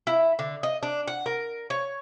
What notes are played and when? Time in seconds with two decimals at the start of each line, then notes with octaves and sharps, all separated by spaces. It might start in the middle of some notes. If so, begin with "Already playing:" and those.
0.07 E4
0.39 D3
0.63 D#5
0.83 D4
1.08 F#5
1.26 A#4
1.70 C#5